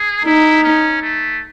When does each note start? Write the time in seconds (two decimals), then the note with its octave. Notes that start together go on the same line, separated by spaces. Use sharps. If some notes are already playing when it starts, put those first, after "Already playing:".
Already playing: G#4
0.25 D#4 E4
0.64 C#4
1.02 A3